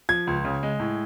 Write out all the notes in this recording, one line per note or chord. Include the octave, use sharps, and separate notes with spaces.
F3 G#6
C#2
C#3
G#3
A2